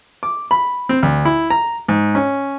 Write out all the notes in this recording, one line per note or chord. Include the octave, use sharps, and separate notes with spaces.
D6
B5
C4
D2
E4
A#5
G#2
C#4